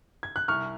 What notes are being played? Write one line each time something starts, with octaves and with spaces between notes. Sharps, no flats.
G#6
F#6
C2 C#6 F6